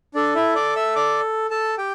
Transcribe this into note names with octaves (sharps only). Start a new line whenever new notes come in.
D4 A4 D5
E4 E5
D5 D6
E5 E6
D5 D6
A4 A5
G4 G5